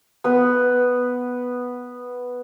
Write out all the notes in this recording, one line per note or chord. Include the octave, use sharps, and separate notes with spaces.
B3 B4